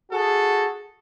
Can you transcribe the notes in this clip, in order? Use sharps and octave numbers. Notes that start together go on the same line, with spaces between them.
F#4 G#4 A4